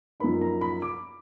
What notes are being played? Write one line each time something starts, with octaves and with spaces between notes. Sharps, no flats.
F#2 F3 A#3 D#4 B5
A#5
B5
D6